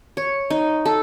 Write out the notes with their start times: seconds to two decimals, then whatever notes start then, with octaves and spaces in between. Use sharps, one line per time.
0.17 C#5
0.50 D#4
0.85 A4